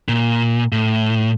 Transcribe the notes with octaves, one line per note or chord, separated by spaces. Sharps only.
A#2
A2